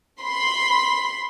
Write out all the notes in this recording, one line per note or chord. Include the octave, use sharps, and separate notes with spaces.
B5 C6 B6